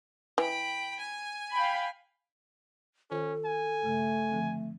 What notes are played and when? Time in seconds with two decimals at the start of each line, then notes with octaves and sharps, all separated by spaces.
0.38 E3 G5 B5
0.99 G#5
1.53 F5 G5 B5
3.11 D#3 C#4 F4 A4 C5
3.45 G#5
3.82 G2 C#3 A3
4.31 D3 F3 C4